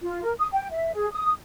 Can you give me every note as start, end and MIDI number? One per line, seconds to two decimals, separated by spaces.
0.02 0.23 65
0.24 0.33 70
0.39 0.47 87
0.52 0.67 79
0.71 0.91 76
0.93 1.07 68
1.12 1.31 87